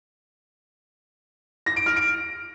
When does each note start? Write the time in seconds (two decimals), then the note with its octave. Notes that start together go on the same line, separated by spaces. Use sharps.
1.66 A#6
1.76 D7
1.86 F6
1.96 D7